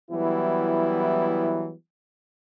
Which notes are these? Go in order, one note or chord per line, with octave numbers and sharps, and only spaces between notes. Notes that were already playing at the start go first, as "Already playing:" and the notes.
E3 F#3 G3 B3 E4